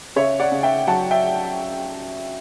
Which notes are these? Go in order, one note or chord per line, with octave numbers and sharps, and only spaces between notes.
C#3 C#5 E5
D5 F#5
C#3
E5 G5
F#3 F#5 A5
E5 G5